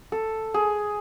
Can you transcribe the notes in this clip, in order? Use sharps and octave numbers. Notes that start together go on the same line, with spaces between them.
A4
G#4